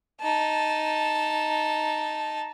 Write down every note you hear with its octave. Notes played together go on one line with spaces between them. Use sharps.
D#4 A5